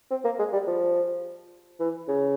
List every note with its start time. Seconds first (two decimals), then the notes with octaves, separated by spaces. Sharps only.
0.10 C4
0.25 A#3
0.39 G#3
0.53 G3
0.67 F3
1.80 E3
2.08 C#3